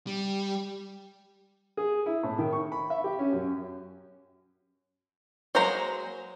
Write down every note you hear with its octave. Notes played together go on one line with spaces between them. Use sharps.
G3
G#4
E4
A2
D#3
C#6
B5
E5
G4
C#4
F#2
F#3 G#3 A#3 C5 A#5